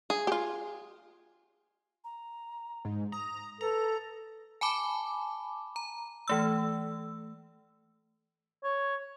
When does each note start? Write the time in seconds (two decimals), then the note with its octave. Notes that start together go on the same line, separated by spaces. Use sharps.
0.10 G#4
0.27 F4 G4
2.04 A#5
2.85 G#2
3.12 A#5 D#6
3.61 A4 B4 A#5
4.61 G#5 A5 B5 D6
5.76 A#5
6.28 E3 A3 E6
8.64 C#5